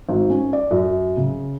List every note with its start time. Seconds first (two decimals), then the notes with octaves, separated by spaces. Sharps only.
0.09 G#1
0.30 C#4
0.53 D5
0.71 F#2
1.17 C#3